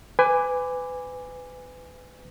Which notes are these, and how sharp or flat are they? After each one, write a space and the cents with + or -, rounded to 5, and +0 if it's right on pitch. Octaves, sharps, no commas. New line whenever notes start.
B4 +25 G#5 -15 D6 +0